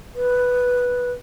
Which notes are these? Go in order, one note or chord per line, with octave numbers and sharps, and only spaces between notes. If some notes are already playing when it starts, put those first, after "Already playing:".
B4